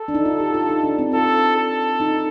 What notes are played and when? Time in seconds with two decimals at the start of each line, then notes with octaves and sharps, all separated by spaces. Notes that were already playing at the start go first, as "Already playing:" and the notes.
Already playing: A4
0.08 D4
0.15 D#4
0.25 F4
0.40 G4
0.54 F4
0.69 D#4
0.84 D4
0.99 C4
1.13 F4 A4
1.57 A4
2.00 D#4